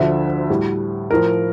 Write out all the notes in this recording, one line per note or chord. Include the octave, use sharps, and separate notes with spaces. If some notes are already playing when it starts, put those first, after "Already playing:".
Already playing: D2 D3 F3 E5
A2 G3
A2 F3 A#4